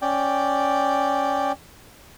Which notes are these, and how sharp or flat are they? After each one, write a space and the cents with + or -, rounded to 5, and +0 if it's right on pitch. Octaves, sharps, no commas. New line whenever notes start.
C#4 +0 D5 +0 G5 +0